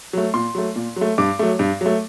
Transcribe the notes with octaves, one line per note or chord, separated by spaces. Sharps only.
F#3 A3
A#2 C6
F#3 A3
A#2
F#3 A3
G2 D6
F#3 A3
G2
F#3 A3